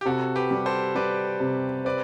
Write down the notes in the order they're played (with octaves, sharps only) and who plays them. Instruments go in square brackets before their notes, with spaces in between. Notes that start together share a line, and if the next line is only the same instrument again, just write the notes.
[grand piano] G4
[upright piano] C3 [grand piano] F#4 A4
[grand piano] G4 B4
[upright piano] G3
[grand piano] A4 C5
[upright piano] G3 [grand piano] B4 D5
[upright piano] C3
[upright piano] C4 [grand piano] B4 D5